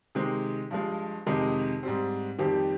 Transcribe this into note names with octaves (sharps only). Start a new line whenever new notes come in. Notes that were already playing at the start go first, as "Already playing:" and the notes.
C3 D#3 G#3 C4
G2 F3 G#3
F2 C3 D#3 G#3 D#4
G#2 G3 C4
F2 D#3 G3 C4 G4